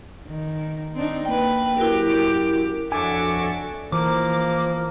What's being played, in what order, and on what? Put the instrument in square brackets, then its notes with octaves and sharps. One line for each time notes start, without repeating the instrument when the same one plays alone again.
[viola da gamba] D#3
C4 D4 D#4
[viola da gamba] A#3 B4 [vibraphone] G5
[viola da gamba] F#2 G4 [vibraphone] E4 F#4 A#4
[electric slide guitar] F2 G#5 [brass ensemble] D4 F#4 [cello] A4 C#5 [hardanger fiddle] E5 D6
[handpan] E3 [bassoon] F3 [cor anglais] A#3 [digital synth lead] D6